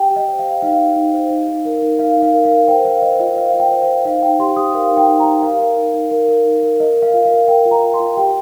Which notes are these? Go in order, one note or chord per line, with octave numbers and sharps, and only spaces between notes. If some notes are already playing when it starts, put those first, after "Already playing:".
Already playing: G4 G5
G4
D#5
C5
F5
C5
D#4 F5
D#4
D#4
C5
D#4
D#4
A#4
D#4
D#4 F5
D#4
F5
A#4
F5
A#4
C5 G5
C5 F5
C5 D#5
F4 D#5
C5 F5
F4 F5
G5
C5
C5 F5
D#4 F5
D#4 G5
G4 C6
G4 D#6
A#4 F5
D#4
G5
D#4
A#5
D#4
A#4 F5
A#4
D#4
D#4
A#4
A#4
D#4
A#4
A#4 D#5
A#4
F5
F4
F5
A#4
A#4 G5
F4
A#5
F4
C6
F4
G4 G5